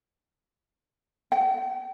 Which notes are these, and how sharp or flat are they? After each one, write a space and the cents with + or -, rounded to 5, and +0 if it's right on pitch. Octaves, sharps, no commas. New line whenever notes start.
G5 -45